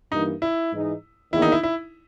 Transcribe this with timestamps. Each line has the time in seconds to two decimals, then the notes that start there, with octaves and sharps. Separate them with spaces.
0.12 G2 E3 A#3 D#4
0.42 E4
0.72 G#2 E3 G#3 D#4
1.33 E2 D#3 A#3 E4
1.42 D#4
1.52 E4
1.63 E4